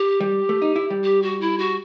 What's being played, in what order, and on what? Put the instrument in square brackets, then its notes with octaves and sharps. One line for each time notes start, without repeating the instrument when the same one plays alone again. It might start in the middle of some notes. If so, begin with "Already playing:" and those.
Already playing: [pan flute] G4
[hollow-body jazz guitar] G3
A3
D#4
E4
G3
[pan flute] G4
F#4
E4
F#4